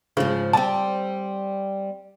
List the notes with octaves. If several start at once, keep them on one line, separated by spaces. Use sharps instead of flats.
G#2 C#3 F3
G3 C4 A5